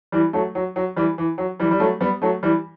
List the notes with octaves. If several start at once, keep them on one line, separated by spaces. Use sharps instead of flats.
E3 G3
F#3 A3
F#3
F#3
E3 G3
E3
F#3
E3 G3
G3
F#3 A3
G3 B3
F#3 A3
E3 G3